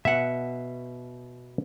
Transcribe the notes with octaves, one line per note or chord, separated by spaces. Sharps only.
B2 E5 F#5